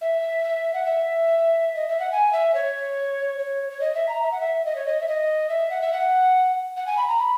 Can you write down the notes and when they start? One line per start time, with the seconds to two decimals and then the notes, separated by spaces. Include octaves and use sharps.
0.01 E5
0.73 F#5
0.85 E5
1.76 D#5
1.88 E5
2.00 F#5
2.12 G#5
2.33 E5
2.54 C#5
3.39 C#5
3.70 C#5
3.81 D#5
3.95 E5
4.09 A#5
4.22 E5
4.31 F#5
4.41 E5
4.65 D#5
4.76 C#5
4.86 D#5
5.01 E5
5.08 D#5
5.49 E5
5.70 F#5
5.81 E5
5.93 F#5
6.77 F#5
6.87 G#5
6.97 B5
7.08 A#5
7.19 B5